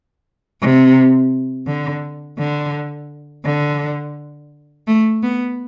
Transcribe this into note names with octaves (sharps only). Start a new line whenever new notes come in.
C3
D3
D3
D3
A3
B3